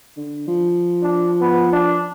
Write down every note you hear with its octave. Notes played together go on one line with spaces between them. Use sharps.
D3
F3
D4
B3
D4